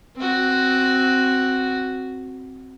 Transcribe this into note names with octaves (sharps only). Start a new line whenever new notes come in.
C4 F#4